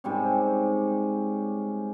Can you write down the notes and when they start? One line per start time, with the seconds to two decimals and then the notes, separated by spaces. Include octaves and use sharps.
0.04 G#2 C3 G3 C#4